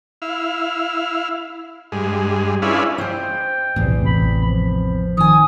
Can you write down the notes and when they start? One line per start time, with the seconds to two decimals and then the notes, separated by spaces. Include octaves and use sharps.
0.22 E4 F5
1.92 G2 G#3
2.62 C#4 D4 E4 F4 G#4 B4
2.98 C5 D#5 G5
3.76 B1 E2 A2 C3
4.05 A1 B5
4.44 F3
5.17 D#3 G#5 D#6